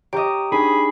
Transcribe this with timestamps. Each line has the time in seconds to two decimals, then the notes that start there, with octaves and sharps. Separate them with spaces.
0.13 G4 C#5 D#5 A#5 D7
0.52 D4 D#4 G#4 C#5 B5